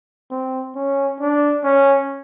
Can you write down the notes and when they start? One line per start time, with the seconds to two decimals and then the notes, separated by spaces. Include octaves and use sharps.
0.31 C4
0.75 C#4
1.20 D4
1.64 C#4